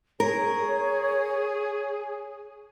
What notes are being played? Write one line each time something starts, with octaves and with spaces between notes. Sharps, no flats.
G#4 A#4 C#5